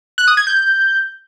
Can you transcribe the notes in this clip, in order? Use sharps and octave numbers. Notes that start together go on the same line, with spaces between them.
F#6
D#6
G#6
G6